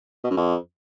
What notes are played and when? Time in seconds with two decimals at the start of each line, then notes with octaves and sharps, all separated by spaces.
0.24 B2
0.30 F#2
0.37 F2